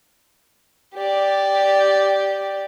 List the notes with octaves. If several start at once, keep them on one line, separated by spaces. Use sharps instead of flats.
G4 D5